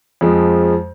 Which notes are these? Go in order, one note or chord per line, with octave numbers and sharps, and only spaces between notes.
F2 F3 G#3